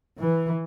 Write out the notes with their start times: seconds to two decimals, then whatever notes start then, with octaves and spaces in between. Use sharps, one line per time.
0.20 E3